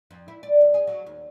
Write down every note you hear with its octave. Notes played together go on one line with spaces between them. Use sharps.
F2
E4
D5
D2
G#4
F#3
D#2